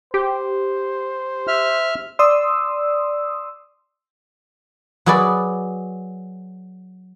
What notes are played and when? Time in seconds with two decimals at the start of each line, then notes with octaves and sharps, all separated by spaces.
0.14 G4 C5
1.47 E5 F6
2.19 D5 C6 D#6 E6
5.06 F#3 F#4 G#4 B4 D5